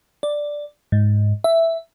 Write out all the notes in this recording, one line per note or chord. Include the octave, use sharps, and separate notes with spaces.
D5
G#2
E5